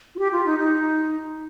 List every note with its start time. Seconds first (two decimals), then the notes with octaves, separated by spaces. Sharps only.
0.15 F4
0.19 G4
0.32 F4
0.46 D#4
0.59 D#4